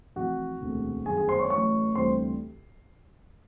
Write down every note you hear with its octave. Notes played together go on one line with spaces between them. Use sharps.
F1 F2 C3 E3 F#4 F#5
E1 D2 C3
G1 F#2 D#3 G#4 G#5
G#4 G#5
C5 C6
C#5 C#6
A1 A2 F#3 C#5 C#6
D2 C3 E3 G3 C5 C6